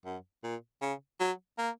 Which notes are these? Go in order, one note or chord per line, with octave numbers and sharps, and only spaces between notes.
F#2
A#2
C#3
F#3
A#3